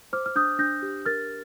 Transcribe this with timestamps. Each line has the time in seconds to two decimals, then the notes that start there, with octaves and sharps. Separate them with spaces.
0.13 C5 D6 F6
0.26 F6
0.36 D4 D#6 G6
0.59 D4 G6 A#6
0.82 G4
1.06 A#4 F6 A6